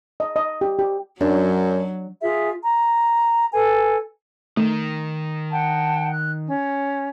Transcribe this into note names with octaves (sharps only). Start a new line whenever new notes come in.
D#5
D#5
G4
G4
F#2 F#3 D4
F4 G#4 E5
A#5
A4 B4 G#5
D#3 A3
F#5 G5 A5
F#6
C#4